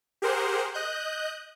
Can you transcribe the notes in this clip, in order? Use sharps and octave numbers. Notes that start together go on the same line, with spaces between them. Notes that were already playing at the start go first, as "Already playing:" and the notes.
G4 G#4 A#4 C5 F#5
D#5 F#6 G6